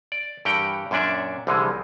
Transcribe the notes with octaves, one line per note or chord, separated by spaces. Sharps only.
D5
G2 E3 G4 A#4 F#5 G5
F#2 A#2 C#4 D4 D5 E5
C2 D3 E3 F3 G#3